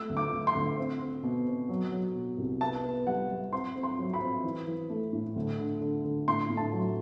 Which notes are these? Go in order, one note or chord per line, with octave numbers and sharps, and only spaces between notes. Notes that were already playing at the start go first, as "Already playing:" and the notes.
Already playing: A3 E6
D2
D6
D2
C6
D2
C4
C4
B2
C4
F#3
F#3
B2
C2
B3 A5
B3
G3 F#5
G3
C4 C6
C4
C6
F#3
B5
C4
E3
E3
A3
A2
D2
D3
D3
D3
A2 C6
A2
A5
F#3